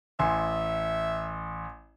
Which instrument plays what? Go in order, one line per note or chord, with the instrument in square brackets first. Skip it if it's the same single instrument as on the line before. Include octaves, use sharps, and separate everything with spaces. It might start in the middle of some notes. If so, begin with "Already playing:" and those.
[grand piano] A1 G#5 C6 [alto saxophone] E5